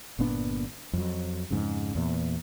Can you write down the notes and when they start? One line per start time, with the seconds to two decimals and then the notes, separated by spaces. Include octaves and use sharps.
0.19 G1 A#2 B3 D4
0.93 F2 F#3
1.50 F2 G#2 C#3
1.95 E2 A#2